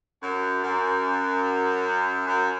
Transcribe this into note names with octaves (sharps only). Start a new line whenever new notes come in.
F#2
F#2
F#2